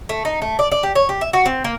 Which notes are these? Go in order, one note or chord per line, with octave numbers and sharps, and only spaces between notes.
A3
D#4
A3
D5
D5
G4
C#5
G4
E5
F#4
C4
A#3